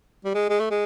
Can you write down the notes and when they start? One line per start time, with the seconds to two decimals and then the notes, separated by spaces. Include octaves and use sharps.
0.25 G3
0.35 G#3
0.49 G#3
0.60 A3
0.71 G#3